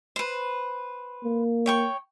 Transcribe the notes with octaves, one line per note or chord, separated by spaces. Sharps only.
B4 C5
A#3
C#5 G5 C#6